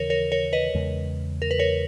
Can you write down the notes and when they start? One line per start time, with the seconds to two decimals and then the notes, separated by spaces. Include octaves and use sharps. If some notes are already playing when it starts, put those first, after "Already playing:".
Already playing: D#2 C#3 E3 A#4 C#5
0.10 A#4 C#5
0.32 A#4 C#5
0.53 B4 D#5
0.74 E2 C#3 G#3
1.42 A#4
1.51 B4
1.59 A#4 C#5